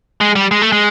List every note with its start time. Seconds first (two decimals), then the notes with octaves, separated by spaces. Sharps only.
0.21 G#3
0.36 G3
0.51 G#3
0.62 A3
0.72 G#3